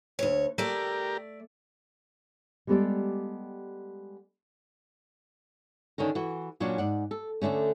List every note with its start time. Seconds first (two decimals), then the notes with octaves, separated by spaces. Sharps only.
0.19 D2 C#5
0.58 A3 G4 A#4 D5
2.67 G3 G#3 B3 G4 A4 D5
5.98 D3 D#3 C#4 A#4
6.15 E3 F#4
6.60 A#2 F#3 C#4 D4 F4 F#4
6.78 G#2 D5 F#5
7.11 A4
7.42 D2 G#2 D3 A3 C#4